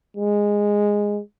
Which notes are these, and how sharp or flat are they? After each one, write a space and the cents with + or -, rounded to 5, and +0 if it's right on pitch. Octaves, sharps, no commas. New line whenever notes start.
G#3 -10